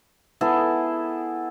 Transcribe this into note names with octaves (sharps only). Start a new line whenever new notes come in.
B3 E4 G#4 A4